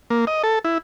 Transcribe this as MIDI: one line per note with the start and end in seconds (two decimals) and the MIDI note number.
0.10 0.25 58
0.27 0.42 75
0.44 0.59 69
0.65 0.78 64